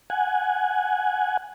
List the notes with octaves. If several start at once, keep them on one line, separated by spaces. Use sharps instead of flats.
F#5 G#5